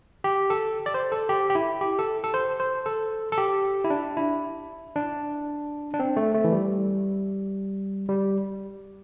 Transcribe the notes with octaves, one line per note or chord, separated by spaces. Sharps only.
G4
A4
D5
C5
A4
G4
G4
E4
G4
A4
A4
C5
C5
A4
A4
G4
E4
D4
E4
D4
D4
C4
A3
A3
E3
G3
G3